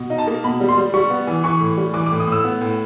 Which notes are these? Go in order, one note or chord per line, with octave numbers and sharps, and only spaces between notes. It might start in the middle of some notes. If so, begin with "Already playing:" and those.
Already playing: B2
D#4
A5
A#3
B2 B5
G3
C6
G3
G3 C#6
B3
E3
E3 C#6
A2
G3
E3 D6
A2 D6
D#6
A2 E6
B3
A2